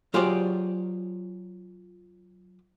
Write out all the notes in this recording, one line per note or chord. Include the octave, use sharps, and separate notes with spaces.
F#3 F4 G4 G#4 C5 D5